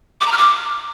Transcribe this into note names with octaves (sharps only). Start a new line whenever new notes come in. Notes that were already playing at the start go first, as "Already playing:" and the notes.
D6
A#5
F6
D6